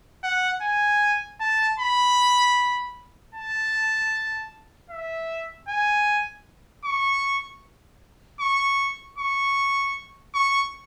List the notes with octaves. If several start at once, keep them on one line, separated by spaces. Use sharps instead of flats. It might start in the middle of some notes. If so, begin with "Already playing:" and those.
F#5
G#5
A5
B5
A5
E5
G#5
C#6
C#6
C#6
C#6